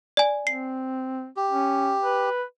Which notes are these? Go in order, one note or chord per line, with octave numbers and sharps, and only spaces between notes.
D5 G#5
C4 C7
G4
C#4
B4